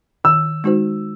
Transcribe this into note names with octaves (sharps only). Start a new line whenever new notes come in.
D#3 E6
G#3 D#4 F#4 C5